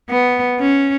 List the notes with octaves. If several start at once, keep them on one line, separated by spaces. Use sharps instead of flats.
B3
C#4